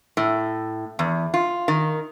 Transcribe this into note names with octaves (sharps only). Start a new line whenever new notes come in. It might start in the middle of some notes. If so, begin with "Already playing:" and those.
A2
E2
F4
D#3